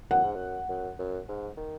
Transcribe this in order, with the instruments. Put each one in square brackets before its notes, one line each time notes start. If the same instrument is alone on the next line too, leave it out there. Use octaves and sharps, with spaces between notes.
[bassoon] F#2 [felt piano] F#5
[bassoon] G#2
F#2
F#2
F#2
G#2
D#3